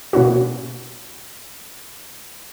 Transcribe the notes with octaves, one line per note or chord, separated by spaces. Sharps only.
B2 A#3 C#4 E4 F#4